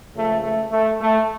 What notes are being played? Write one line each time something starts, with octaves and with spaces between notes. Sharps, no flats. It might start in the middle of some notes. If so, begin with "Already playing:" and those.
C#2 C#3 F3 A3
A3
A3
A3